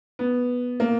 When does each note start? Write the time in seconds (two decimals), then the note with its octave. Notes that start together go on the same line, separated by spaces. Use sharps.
0.19 B3
0.80 A#3